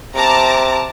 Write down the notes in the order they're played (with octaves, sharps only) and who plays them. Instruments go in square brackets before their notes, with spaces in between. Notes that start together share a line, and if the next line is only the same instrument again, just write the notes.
[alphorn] C3 [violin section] A5 A#5 D6